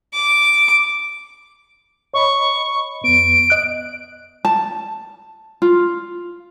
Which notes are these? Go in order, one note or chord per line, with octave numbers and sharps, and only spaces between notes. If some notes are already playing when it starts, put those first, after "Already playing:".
D6
C#5 D#5 B5 C#6
F2 B3 D7
D#5 F#6
A5
F4